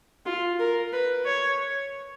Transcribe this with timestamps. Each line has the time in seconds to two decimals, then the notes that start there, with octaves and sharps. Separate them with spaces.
0.26 F4
0.59 A#4
0.92 B4
1.25 C#5